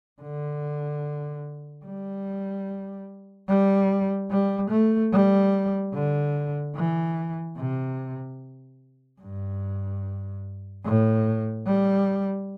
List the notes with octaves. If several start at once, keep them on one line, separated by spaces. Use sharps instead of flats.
D3
G3
G3
G3
A3
G3
D3
E3
C3
G2
A2
G3